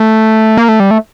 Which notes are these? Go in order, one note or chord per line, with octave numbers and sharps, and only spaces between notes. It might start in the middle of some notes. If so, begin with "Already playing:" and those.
Already playing: A3
A#3
A3
G3
A3